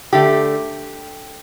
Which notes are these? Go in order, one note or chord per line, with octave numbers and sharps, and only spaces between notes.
D3 A3 G4